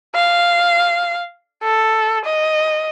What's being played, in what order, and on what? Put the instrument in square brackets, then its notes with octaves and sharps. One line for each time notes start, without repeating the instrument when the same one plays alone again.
[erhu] F5
A4
D#5